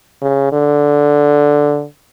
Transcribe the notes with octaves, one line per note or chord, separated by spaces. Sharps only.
C#3
D3